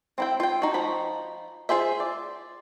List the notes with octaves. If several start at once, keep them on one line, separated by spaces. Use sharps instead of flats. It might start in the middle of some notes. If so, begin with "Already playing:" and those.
C4 E4 G5
F4 G5
D#4 F#4
F3 D#4 B5
F4 G#4 C5 E5
D5